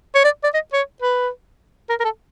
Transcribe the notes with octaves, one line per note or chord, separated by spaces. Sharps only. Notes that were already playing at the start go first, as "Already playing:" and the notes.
C#5
D5
D5
D#5
C#5
B4
A#4
A#4
A4